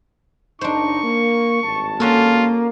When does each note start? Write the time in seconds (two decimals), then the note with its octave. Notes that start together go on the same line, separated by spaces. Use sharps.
0.61 F#1 D4 D#4 C5 C#6
1.04 A#3
1.63 G#1 G2 A5
2.00 A#3 C#4 F4 F#4 A4